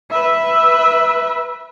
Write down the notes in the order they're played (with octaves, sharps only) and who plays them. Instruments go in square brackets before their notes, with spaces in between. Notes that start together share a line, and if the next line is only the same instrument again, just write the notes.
[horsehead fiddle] B4 E5